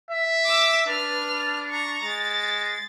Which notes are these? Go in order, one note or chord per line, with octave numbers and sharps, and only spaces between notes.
E5
D6 E6
D4 B4 F6
A#5 C#6
G#3 A6